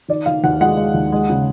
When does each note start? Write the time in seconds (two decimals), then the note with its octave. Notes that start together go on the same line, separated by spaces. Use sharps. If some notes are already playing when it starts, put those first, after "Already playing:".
0.08 D#3 D5
0.26 D#3 F5
0.44 D#2 F#5
0.61 G#3 F#5
0.77 G#3
0.94 D#2
1.12 G#3
1.30 C#3